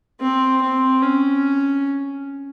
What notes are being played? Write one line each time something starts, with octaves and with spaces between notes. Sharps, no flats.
C4
C4
C#4